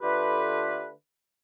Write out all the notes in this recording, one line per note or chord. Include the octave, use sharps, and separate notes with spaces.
D3 A3 F4 G4 B4